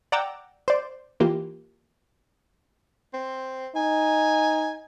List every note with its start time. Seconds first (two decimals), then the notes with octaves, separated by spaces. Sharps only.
0.12 D5 F#5 G5 A#5 D6 E6
0.68 C5 D5
1.20 E3 A#3 F4 G4
3.14 C4
3.76 D#4 G#5